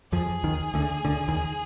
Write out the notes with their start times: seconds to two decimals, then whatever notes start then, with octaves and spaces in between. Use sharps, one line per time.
0.12 F2 F3 G#4
0.44 D#2 D#3
0.74 D2 D3
1.05 D2 D3
1.28 D#2 D#3